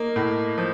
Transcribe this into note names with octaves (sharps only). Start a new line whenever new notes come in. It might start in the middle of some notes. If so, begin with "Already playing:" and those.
Already playing: A#3 D#4
A2
F3